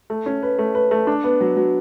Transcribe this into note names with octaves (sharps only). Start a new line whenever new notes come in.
A3
C#4
B4
A3
B4
A3
D4
B3
F#3
F#3